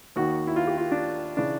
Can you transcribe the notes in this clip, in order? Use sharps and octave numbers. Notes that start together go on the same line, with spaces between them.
D#2 D#3 F#4
E4
F4
G4
F4
D4
C#3 E3 D4